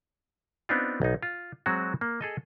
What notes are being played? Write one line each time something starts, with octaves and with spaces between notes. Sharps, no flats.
B3 C4 D4 D#4 F4
B1 D#4
F4
F#3 G#3 C4 F#4
A#3
G#4 A4 D#5